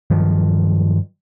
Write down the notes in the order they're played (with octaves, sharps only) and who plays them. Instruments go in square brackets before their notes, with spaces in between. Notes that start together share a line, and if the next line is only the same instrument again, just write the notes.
[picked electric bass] G2 D#3 F3 F#3